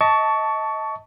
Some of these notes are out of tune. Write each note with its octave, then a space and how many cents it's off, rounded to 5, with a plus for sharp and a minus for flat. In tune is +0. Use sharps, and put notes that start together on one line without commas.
D#5 +25 A5 +0 C#6 +25